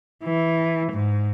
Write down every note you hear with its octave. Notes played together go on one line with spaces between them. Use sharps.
E3
G#2